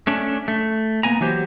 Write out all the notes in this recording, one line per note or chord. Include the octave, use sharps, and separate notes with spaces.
A3 C#4 D4
A3
A#3 B3 G#5 A#5
E3 F#3 G4 C5